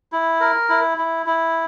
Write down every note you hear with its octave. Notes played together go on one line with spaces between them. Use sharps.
E4
A#4
E4
E4
E4